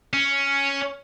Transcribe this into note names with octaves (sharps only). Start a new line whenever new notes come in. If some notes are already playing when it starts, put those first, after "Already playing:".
C#4